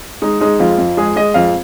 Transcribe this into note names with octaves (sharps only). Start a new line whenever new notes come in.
G#3 D#4
G#3 D#4
F2 F4
F2
G#3 G#4
G#3 D#5
F2 F5